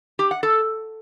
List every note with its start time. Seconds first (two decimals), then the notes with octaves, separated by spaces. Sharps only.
0.19 G4
0.31 F#5
0.43 A4